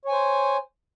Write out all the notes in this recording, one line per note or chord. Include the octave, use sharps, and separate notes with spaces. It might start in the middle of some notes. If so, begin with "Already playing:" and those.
C5 C#5 G#5